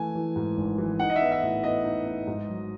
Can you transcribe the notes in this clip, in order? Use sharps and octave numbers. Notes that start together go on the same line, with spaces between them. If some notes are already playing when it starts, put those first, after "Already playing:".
Already playing: E3 A3 G#5
E3
G#2
G#1
E3
D#4 F#5
D#5
E5
B3
E5
A2
B3 D#5
D#4
D#4
G#2
F#3